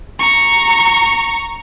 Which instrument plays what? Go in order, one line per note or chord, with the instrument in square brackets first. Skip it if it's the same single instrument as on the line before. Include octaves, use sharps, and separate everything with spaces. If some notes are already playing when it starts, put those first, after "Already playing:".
[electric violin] A#5 C#6